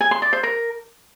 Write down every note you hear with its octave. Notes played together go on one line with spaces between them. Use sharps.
G#5
C6
D5
C5
A#4